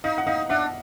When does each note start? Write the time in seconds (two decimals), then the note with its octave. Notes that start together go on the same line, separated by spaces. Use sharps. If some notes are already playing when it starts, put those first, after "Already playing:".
0.04 D#4 D#5 F5
0.18 F#5
0.26 D#4 D#5 F5
0.49 D4 E5 F#5